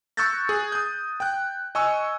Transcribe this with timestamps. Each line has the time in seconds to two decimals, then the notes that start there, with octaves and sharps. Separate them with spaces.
0.17 C#6 E6 F#6 G6 A6 A#6
0.49 G#4
0.72 D#6 G6
1.20 G5 F#6
1.75 D#5 G#5 C#6 E6